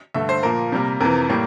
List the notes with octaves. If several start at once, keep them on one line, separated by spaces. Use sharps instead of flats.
G2 D3 A3 E5
C5
A#2 F3 A#3 A#4
C3 G3 A#3
F2 C3 E3 A#4
A2 G3 A#3